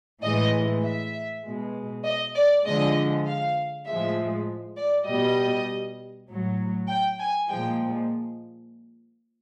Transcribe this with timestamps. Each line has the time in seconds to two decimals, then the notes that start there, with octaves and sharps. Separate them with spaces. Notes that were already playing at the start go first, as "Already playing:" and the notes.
0.23 A2 E3 G#3 D#5
0.84 E5
1.45 B2 G#3
2.05 D#5
2.36 D5
2.66 D3 F3 G#3 D#5
3.27 F5
3.87 A2 F3 G#3 E5
4.77 D5
5.08 B2 G3 D#5
6.29 A2 F#3
6.89 G5
7.19 G#5
7.50 A#2 F3 G#3 G5